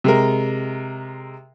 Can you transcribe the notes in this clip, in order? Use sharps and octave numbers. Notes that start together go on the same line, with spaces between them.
C3 G#3 A#4